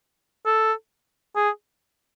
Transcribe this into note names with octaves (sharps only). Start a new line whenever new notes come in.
A4
G#4